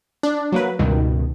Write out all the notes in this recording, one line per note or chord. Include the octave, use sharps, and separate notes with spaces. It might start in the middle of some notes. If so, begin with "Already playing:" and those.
D4
F#3 A#3 B4
C#2 G2 B2 D#3